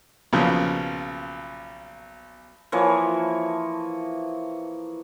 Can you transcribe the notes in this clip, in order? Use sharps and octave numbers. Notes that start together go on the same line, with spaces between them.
B1 A#2 C#3 F3
E3 F3 A#3 C#5